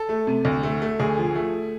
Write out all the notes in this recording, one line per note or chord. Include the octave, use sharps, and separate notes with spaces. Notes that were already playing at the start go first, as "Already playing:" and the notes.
Already playing: A4
A3
C3
D2
A3
A3
D2 G#4
F3
A3